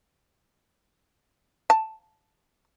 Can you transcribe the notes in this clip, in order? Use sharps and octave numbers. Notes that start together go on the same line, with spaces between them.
A5